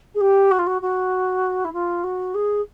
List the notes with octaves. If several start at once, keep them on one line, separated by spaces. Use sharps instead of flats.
G#4
G4
F#4
F4
F#4
F#4
E4
F4
F#4
G#4